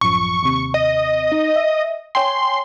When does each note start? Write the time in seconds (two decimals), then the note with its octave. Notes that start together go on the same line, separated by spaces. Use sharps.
0.01 A1 F#2 F3 C#6
0.43 D#2 C3
0.74 D#5
1.32 D#4
1.56 E5
2.15 C#5 G5 G#5 C6